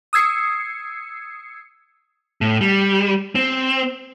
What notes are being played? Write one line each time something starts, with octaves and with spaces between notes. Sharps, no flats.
D#6 E6 G#6 C7 C#7
A2
G3
C4